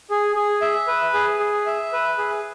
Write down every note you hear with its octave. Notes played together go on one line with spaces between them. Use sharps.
G#4
G#4
E5
B4
G#4
G#4
E5
B4
G#4